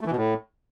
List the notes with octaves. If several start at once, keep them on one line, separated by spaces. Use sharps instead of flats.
A3
E3
B2
A2